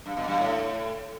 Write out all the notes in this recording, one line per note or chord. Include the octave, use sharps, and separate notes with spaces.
G2
B2
G2
A2